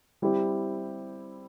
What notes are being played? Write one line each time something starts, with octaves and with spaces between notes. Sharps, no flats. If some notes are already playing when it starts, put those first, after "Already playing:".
G3 C4 E4 G4